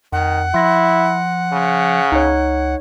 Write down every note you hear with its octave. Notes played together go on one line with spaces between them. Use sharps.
F2 D#3 F#5
F3 E4 C6 A#6
C#3
C#2 D#4 C#5